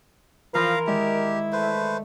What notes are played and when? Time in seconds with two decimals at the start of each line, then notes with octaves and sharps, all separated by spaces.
0.54 E3 F3 A#4 F5 A#5 C6
0.87 D#3 G#3 E4 G4 D5
1.52 A3 B4 C5